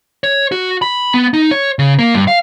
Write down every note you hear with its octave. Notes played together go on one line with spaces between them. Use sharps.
C#5
F#4
B5
B3
D#4
C#5
C#3
A#3
G2
F5